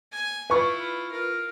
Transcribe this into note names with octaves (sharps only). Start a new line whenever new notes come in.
G#5
E4 F4 B4 C#6
F4 A#4